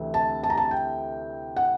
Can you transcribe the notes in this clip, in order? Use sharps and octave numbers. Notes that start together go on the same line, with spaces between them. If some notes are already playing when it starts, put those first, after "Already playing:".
Already playing: D2 C3 E3
A5
A5
A#5
A5
G5
F#5